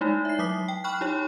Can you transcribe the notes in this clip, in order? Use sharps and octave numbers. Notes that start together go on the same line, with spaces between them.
G#3 A3 D#4 E4
E5 C7
F#3 D6 D#6 B6
G5
G5 B5 C#6 F6 F#6
D#4 E4 G4 C#5